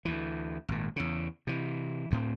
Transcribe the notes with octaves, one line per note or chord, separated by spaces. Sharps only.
D2 E3
G#1 A#2
E2 C#3
C3 E3
D2 A2 C4